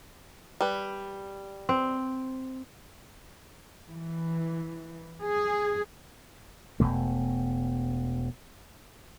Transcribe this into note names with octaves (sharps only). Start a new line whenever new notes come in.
G3 B4
C4
E3
G#4
E1 C#2 B2 A3